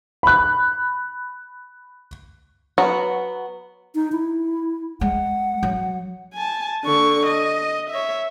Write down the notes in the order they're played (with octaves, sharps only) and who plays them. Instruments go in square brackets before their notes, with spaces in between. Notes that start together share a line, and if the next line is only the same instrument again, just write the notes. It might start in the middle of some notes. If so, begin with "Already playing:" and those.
[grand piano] B5 F#6
[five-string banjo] F#3 B3 F#4
[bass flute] D#4
E4
[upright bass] G#3 [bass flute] F#5
[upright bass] F#3
[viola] G#5 A5
D3 C#6
D#5
C#5 E5